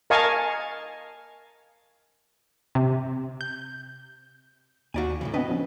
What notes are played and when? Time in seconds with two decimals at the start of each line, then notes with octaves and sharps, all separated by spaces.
0.10 A#4 D#5 F5 G#5 A5 C#6
2.75 C3
3.41 G6
4.94 D#2 D#4 F#4 D5 F5 G#5
5.21 A2 C#3 E3
5.34 B3 C4 D4 B4 D#5
5.50 F3 B3 C#4